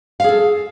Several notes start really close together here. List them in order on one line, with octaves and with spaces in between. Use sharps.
F5 G#4 A4